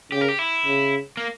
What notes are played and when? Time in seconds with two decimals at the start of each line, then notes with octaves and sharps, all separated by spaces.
0.12 C#3 G4
0.21 A#4
0.29 G4
0.39 E4
0.66 C#3
1.17 A#3